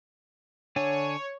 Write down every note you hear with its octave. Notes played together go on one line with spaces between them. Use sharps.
D3 D4 C#5 G#5